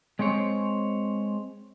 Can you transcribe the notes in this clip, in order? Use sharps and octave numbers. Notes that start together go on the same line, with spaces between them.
G#3 C4 C5 C#5